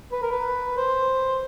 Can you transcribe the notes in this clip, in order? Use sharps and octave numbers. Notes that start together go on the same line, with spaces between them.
B4
A#4
B4
C5